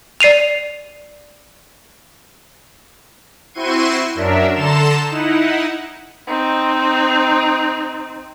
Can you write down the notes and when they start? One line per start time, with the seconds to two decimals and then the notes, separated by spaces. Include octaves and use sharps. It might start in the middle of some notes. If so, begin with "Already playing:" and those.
0.20 D5 C7 D#7 F7
3.54 C4 E4 F#4 C6 C#6 D#7
4.15 F#2 F#3 D4 A#4 E5
4.54 D3 A4 A5 A#5 C6 E7
5.09 D#4 E4 F#5
6.28 C4 D#4